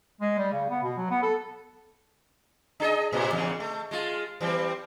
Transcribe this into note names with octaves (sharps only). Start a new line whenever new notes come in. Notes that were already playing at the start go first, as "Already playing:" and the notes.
G#3
G3
C#3
B3
B2
F#3
B3
A4
D4 G#4 D#5
A2 C3 A#3
E2 G#2 C#3
A3
G#3 F4
E3 G3 C4